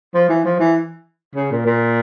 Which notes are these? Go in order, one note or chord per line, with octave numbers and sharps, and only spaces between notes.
F3
E3
F3
E3
C#3
A#2
A#2